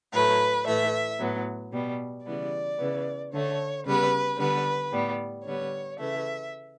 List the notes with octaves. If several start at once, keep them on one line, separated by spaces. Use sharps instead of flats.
A2 F#3 A3 B4
A2 E3 A3 E5
A2 F#3 B3
B2 G3 B3
C#3 E3 G3 B3 D5
C#3 E3 B3
D3 A3 C#5
C#3 G3 B3 B4
D3 G3 B3 B4
A2 G3 B3
D3 G3 B3 C#5
C#3 E3 A3 E5